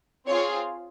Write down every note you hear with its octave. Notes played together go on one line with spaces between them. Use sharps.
C4 F4 G#4 C#5